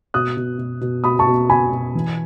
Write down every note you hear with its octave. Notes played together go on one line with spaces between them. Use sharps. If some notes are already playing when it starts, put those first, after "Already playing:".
B2 D#6 F#6
B2
B2
B2
B2 B5 D#6
A5 C#6
B2
B2 G#5 B5
B2
E3